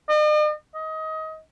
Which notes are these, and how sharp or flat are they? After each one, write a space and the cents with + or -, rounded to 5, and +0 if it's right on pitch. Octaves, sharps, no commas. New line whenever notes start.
D#5 -45
D#5 +25